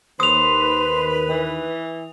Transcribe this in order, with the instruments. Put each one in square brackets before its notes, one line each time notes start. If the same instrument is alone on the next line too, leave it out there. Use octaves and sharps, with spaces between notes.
[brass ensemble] D#2 [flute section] B4 [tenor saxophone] C5 [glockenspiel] D#6 F7
[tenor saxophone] E3